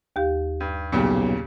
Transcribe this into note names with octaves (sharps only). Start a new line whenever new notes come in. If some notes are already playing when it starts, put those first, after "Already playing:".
D#2 G4 F5
G2
B1 A#2 C#3 G3